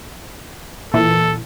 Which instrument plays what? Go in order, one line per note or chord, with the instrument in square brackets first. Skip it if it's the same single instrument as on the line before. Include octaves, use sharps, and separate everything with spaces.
[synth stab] A#2 E3 [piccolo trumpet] A4